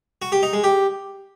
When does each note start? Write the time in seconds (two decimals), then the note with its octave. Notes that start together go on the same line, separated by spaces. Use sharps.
0.22 F#4
0.32 G4
0.43 D#4
0.53 G#3
0.64 G4